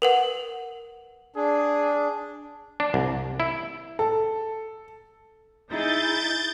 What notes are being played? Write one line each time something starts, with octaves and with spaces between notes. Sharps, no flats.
A#4 B4 F#5
D4 G#4
D4
C2
E4
A4
D#4 E4 G#4 G6 A6